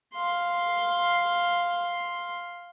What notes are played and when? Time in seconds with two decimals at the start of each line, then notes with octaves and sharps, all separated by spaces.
0.13 F5 C6